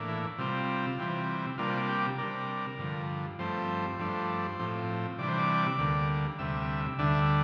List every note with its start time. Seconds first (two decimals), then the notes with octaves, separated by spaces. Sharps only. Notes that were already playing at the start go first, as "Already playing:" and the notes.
Already playing: A2 E3 A#3 D4
0.08 E4
0.38 C3 G3 C4 F4
0.98 C3 E3 G3 C4
1.58 C3 G3 A#3 D4 F4
1.89 G4
2.18 C3 G3 D4 A#4
2.78 G2 D3 F3
3.39 G2 F3 A3 C4 C5
3.98 G2 F3 A3 D4
4.59 A2 F3 C4
5.18 C3 E3 G3 D4 D5
5.28 C5
5.38 D5
5.79 D2 D3 G3 A#3
6.39 D2 C3 G3 E5
6.98 D2 D3 G3 D4 E5